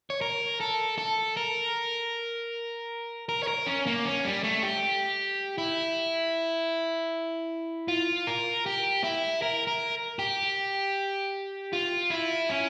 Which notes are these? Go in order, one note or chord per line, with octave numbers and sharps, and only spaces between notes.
C#5
A#4
A4
A4
A#4
A#4
C#5
A#4
C#4
A#3
C#4
G3
A3
G4
E4
F4
A#4
G4
E4
A#4
A#4
G4
F4
E4
C#4